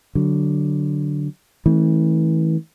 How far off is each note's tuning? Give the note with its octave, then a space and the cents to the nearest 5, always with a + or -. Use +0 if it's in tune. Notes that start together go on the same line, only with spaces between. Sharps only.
D3 +0 F#3 +10
E3 -35 A3 -10 C4 +40